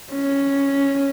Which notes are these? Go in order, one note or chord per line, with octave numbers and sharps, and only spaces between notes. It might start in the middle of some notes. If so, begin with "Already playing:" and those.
C#4